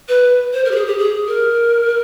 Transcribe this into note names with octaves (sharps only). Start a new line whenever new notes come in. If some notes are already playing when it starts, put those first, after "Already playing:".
B4
C5
A#4
G4
G#4
G4
G#4
A#4